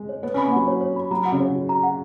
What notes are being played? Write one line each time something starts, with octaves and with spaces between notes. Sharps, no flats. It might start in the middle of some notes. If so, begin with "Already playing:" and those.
Already playing: G#3
C#5
B3 C#5
C#4
B5
A#3
F#3 F#5
C#5
C#5
B5
F#3 A#5
F#5
C#3
C#5
F#4
A#5
F#5